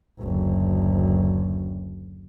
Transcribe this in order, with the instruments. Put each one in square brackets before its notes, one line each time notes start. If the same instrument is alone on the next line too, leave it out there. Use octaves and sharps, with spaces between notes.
[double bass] F#1 D2